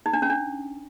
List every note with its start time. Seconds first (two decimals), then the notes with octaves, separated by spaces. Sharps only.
0.06 D#4
0.13 D4
0.22 C#4
0.30 D4